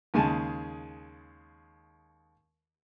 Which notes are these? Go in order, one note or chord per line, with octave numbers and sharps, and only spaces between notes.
D#2 C#3 G#3 G#5 A5